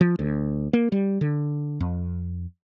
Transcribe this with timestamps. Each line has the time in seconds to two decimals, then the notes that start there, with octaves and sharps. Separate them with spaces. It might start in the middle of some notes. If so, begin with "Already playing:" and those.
0.01 F3
0.19 D2
0.73 A#3
0.92 G3
1.21 D3
1.80 F2